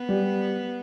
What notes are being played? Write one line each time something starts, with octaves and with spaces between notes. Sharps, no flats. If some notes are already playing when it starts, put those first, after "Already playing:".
Already playing: B3
G3